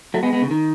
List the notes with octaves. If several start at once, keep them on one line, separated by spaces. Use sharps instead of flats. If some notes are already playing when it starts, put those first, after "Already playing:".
F#3 A3
G#3 B3
G#3 B3
C#3
D#3